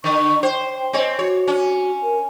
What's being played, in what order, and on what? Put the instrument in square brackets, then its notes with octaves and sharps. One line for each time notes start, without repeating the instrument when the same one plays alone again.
[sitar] D3 [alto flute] C#6
[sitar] C5 [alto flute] G5
[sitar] C4 C#5 [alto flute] D#5
[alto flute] F#4 [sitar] C#5
[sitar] C#4
[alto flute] A#4